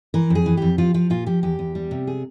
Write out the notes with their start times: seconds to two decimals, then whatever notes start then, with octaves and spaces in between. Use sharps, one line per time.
0.14 E3 A#4
0.30 F2
0.35 G#4
0.46 E3
0.57 F2 G4
0.78 F3 F4
0.94 F3 F4
1.10 A#2 F4
1.27 F3 G4
1.43 E2 G4
1.59 E2
1.75 G3
1.91 C3
2.07 G#4